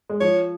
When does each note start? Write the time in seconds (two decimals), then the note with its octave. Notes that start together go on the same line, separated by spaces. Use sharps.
0.09 G#3
0.21 F3 C#5